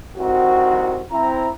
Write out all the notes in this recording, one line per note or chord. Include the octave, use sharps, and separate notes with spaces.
C2 D#3 C4 F#4
C4 E4 A#5